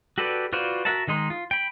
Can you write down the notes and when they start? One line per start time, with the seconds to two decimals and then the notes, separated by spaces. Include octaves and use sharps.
0.18 F#4 G4 A4 B4 D5
0.53 F4 F#4 B4 C5 D5
0.85 F#4 A#4 E5 F#5 A5
1.08 D#3 G#3 D#4 C6
1.30 F4
1.51 G5 B5